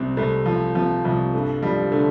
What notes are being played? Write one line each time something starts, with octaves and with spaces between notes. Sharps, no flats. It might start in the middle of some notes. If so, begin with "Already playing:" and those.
Already playing: C2 C3 C4
C2 A3
F3
C3 F3
C2 F3
G2 A3
F3 G3
D3 A3